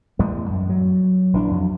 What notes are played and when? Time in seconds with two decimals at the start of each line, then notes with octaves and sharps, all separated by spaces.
0.19 E2 A2 G3 G#3
0.50 F#2
0.69 F#3
1.33 A#1 E3 C4 D4
1.51 F2 F#3